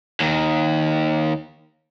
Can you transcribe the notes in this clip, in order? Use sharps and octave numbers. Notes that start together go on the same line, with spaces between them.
D#2 D#3